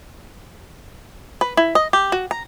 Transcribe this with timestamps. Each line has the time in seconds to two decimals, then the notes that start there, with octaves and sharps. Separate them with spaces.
1.41 B4
1.57 E4
1.75 D#5
1.93 G4
2.12 F#4
2.31 A#5